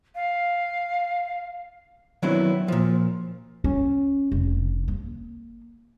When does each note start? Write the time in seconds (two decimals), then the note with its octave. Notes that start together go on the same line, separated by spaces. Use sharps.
0.15 F5
2.22 D#3 F#3 B3 C4 D4 E4
2.68 A#2 F3
3.64 C#4
4.32 F1
4.88 A#3